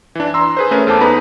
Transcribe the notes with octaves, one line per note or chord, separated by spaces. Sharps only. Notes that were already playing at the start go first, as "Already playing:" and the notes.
E3 D4
A#5 C6 E6
G#4 B4 C5
A3 C#4 A#4 B4
E2 A4 C5 A5 D6
B3 D#4 G#4 B4 A#5 B5